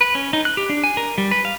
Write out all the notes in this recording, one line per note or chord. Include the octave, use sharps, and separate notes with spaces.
B4
C#4
D#4
F#6
G4
D4
G#5
A#4
G3
B4
F5